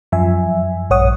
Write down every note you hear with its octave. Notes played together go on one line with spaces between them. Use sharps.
F#2 F3 E5 G#5
A#1 G2 C#5 F#5 D#6